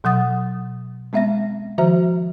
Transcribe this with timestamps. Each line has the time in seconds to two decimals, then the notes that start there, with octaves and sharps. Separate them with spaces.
0.04 B2 F#3 F#5 D#6 A6
1.13 G#3 B3 C4 E5 F5 A#6
1.78 D#3 F3 F#4 C5 E5 A#5